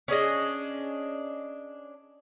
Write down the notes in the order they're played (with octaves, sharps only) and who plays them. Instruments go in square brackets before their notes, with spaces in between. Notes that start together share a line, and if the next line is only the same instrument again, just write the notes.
[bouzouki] C#4 D4 G#4 D#5